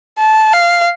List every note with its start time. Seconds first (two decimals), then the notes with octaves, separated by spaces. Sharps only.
0.18 A5
0.53 F5